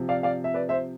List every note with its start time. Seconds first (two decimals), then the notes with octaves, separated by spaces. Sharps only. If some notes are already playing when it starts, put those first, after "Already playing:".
Already playing: C3 F3
0.09 D5 F5
0.23 D5 F5
0.44 E5
0.54 B4 D5
0.69 C5 E5